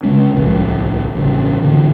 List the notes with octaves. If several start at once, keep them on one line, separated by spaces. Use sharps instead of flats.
C#3 F3 G#3 C#4
D1 C2 F3
A1 G2 C#3
G#2 D3 E3